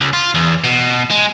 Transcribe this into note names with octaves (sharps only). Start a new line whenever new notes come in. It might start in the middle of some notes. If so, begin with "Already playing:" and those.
C#2
F4
E2
B2
G#3